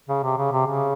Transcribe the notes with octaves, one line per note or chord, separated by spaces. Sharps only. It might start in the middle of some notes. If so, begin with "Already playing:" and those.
C#3
C3
C#3
C3
C#3